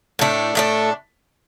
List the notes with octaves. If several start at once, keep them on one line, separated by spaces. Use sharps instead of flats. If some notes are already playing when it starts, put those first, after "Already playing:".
A2 A3 D4
A2 A3 D4